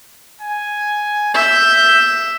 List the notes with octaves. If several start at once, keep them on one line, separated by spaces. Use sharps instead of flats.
G#5
E5 G6